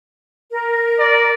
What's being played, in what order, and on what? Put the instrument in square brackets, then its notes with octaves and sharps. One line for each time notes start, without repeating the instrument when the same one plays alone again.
[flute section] A#4
[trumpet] D5